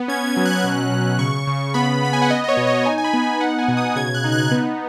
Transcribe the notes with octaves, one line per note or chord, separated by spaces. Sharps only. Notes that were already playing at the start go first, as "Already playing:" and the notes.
Already playing: B3
C#4 G#6
G#6
F#3
F#6
B2 F#6
B2
C#3 C#6
C#3
B3 B5
B3 B5
G#5
F#5
B3 D#5
D#5
C#5
B2
D#5
D#4 G#5
G#5
B5
B3
G#5
D#4 F#5
G#5
B2
D#6
C#3 G#6
F#6
D#4
F#6
B3